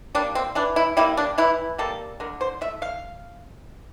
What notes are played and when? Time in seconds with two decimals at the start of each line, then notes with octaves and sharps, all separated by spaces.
0.15 G3 A#3 D4
0.35 C4
0.55 E3 D4
0.76 E4
0.97 G3 A#3 E4
1.17 D4
1.38 E3 E4
1.78 G3 A#3 A4
2.20 D3 A#4
2.41 C5
2.61 A3 E5
2.82 F5